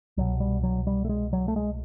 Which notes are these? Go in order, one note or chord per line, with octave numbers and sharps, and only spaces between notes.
C2 B2 F#3
G3
F#3
G3
A3
G#3
F#3
A3
G#3